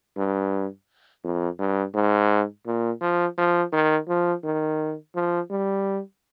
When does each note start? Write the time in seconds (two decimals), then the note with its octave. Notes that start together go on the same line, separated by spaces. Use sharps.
0.17 G2
1.24 F2
1.59 G2
1.94 G#2
2.66 A#2
3.01 F3
3.38 F3
3.73 D#3
4.08 F3
4.44 D#3
5.15 F3
5.50 G3